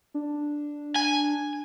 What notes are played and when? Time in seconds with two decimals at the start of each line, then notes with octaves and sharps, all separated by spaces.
0.14 D4
0.96 G#5